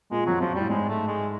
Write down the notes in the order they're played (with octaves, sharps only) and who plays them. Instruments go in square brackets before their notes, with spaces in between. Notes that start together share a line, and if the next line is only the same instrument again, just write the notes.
[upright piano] A#2 [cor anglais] G#3
[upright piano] F2 [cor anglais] F#3
[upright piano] F#2 [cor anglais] F3
[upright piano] A2 [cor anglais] G3
[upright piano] G#2 [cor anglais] G#3
[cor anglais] A3
G#3